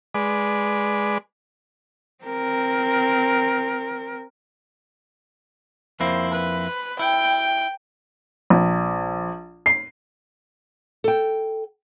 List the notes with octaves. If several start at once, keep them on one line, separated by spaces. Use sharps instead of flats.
G#3 B4 D5
C4 A#4
F2 A#3 E4 C5
B4
E4 G5
A#1
C7
A4 G5